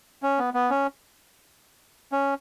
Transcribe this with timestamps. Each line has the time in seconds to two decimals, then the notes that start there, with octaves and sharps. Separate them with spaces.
0.23 C#4
0.39 B3
0.54 B3
0.70 C#4
2.12 C#4